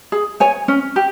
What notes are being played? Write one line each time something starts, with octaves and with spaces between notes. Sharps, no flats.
G#4
C#5 G#5
C#4
G4